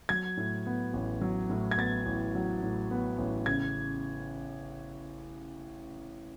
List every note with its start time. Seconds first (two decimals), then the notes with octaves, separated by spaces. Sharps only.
0.09 F#3 G#6
0.37 A2
0.66 B3
0.93 A1
1.21 F#3
1.50 A2
1.71 G#6
1.78 B3 A6
2.06 A1
2.35 F#3
2.63 A2
2.91 B3
3.18 A1
3.46 C#3 G#6